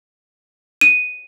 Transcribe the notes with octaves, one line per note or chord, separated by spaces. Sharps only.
D#7